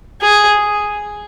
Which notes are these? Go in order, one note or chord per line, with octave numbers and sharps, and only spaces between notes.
G#4